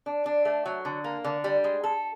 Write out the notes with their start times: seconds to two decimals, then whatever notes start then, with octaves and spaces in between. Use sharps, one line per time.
0.06 D4
0.26 D4
0.45 A3
0.66 F#3
0.85 D3
1.04 A#3
1.24 D3
1.44 G3
1.64 G#3
1.84 A4